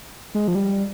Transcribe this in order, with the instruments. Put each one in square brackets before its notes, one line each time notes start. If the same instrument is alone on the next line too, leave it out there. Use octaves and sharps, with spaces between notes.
[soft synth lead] G#3
F3
G3